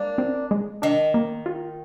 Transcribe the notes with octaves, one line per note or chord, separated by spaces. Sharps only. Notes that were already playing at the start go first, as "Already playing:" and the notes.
Already playing: G#3 A#3 D4
C4
G#3
D#3 D4
A#3
F4